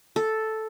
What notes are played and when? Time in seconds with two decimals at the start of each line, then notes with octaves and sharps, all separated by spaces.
0.16 A4